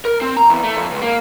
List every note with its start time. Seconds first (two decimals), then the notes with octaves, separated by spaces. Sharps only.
0.05 A#4
0.21 C4
0.37 A#5
0.50 E2
0.64 A3
0.76 F2
0.90 C#2
1.02 A#3